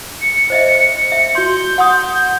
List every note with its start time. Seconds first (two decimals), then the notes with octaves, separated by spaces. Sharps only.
0.22 C#7
0.50 C5 D#5 E5
1.12 E5
1.35 F#4 C6 G6
1.78 F#5 C6 D#6